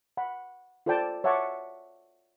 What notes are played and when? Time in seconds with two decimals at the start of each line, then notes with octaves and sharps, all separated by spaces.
0.17 F#5 B5
0.86 F4 A4 C5 D5 G5 A5
1.24 C#5 E5 F#5 A5 C#6 D6